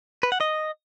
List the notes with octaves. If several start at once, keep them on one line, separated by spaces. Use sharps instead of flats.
B4
F#5
D#5